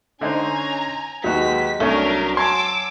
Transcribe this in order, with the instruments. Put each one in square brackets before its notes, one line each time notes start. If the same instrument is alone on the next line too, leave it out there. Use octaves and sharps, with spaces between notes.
[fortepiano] D3 D#4 C5 [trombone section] C#4 [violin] G#5 A#5
[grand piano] D#2 F#3 [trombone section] G#3 B3 G4 [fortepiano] D#4 F#4 [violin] B6
[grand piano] C2 [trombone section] F#3 [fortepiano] A3 C#4 [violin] D4 A#4
[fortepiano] G#5 A5 C6 [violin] D6 E6 [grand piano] G#6